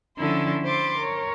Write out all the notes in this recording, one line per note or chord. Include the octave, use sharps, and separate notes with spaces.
D3 F3 C#4 E4 A4 C6
C5 B5 C6 D6 A6
A#4 C#5